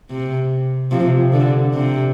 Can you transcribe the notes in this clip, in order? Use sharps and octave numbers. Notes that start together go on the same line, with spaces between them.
C3
C3 F3
D3
C3